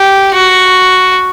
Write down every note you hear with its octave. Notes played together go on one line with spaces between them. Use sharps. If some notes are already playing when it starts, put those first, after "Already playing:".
Already playing: G4
F#4